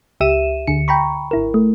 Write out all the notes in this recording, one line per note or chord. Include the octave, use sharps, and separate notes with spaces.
C#2 G4 E5 D#7 E7
D2 D3 C#7
G5 A#5 B5 C#6
G#1 E4 A#4
A3